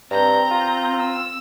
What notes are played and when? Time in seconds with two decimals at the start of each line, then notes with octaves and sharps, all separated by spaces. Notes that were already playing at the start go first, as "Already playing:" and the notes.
0.11 G2 C4 A#5 G6
0.50 F4
1.00 E6